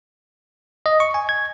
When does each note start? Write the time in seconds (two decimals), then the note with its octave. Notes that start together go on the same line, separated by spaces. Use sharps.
0.86 D#5
1.00 C#6
1.14 G#5
1.29 G#6